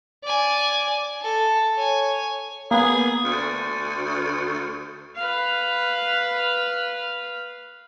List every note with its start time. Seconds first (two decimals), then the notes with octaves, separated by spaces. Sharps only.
0.24 D5 G#5
1.22 A4
1.76 C#5 G#5
2.71 A#3 B3 G#4
3.25 D2
5.17 B4 F5